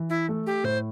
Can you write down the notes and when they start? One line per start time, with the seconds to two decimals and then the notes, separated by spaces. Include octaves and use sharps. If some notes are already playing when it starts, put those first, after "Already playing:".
Already playing: E3
0.10 E4
0.29 A3
0.46 G4
0.64 A2 C5